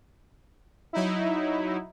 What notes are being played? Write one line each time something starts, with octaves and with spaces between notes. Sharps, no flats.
F#3 D#4 E4